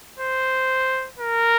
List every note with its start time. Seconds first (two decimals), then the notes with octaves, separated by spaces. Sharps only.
0.19 C5
1.19 A#4